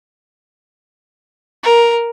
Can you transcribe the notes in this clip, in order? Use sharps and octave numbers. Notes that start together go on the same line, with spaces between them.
A#4